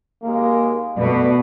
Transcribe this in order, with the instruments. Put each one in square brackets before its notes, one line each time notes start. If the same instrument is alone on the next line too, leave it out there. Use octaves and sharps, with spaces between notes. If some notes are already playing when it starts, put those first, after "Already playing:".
[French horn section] D#2 G#3 A#3
[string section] B2 [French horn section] A3 B4 D5